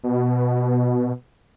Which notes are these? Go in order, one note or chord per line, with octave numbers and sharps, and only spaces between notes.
B2